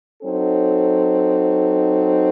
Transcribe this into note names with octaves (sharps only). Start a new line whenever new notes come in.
F#3 C4 D#4 A4